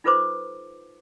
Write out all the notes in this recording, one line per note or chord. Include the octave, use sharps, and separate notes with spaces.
D#4 F4 A4 B4 C5 D6